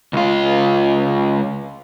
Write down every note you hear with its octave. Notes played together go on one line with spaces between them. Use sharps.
C#2 F4